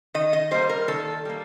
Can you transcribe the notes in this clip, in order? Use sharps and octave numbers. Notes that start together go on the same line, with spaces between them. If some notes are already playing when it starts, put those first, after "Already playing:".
D#3 D#5
D#5
G3 A#3 C5
A#4
D#3 A4
G3 A#3